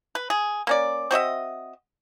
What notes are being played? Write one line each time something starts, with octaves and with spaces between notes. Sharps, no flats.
B4
G#4
A#3 C#4 D5
C4 F#4 D#5 E5